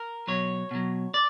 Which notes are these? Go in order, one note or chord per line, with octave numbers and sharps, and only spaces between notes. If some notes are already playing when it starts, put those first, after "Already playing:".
Already playing: A#4
B2 F#3 C#5
B2 F#3
D5